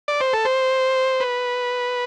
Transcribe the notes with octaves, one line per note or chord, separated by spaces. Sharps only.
D5
C5
A4
C5
B4